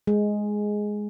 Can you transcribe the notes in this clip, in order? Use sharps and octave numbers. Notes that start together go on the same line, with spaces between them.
G#3